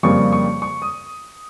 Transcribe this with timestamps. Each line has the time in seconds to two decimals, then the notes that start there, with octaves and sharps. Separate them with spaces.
0.03 F2 C#3 G3 A#3 C#6
0.32 C#6
0.62 C#6
0.82 D#6